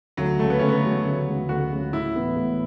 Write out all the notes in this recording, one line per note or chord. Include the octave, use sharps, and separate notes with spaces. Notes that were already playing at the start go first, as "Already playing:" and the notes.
D2 F#3
C#3 F#3 A3
B3
D2 C#4
B3
C#3 F#3
D2
C#3 F#3
D2 F#4
C#3 F#3
A2 E4
E3 B3
A2